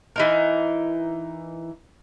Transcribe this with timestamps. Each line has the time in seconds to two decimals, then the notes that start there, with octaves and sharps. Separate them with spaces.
0.16 E3 D#4 A#4